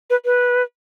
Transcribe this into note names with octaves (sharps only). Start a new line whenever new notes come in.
B4
B4